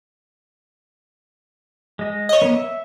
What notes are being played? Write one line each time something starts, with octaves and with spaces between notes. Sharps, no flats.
G#3 D#5
C#5 D#5
A#3 B3
E5